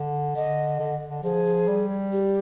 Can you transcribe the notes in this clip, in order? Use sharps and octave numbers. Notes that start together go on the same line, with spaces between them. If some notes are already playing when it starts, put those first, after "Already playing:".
Already playing: D3
D3 D#5
D3
D3
F3 G#4
G3
G4